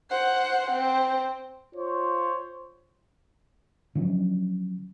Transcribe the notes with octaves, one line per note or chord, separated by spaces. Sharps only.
C5 F#5
C4
F4 C5 C#5
D3 F3 F#3 C#4